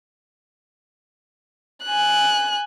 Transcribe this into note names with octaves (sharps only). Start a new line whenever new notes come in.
G#5 F#6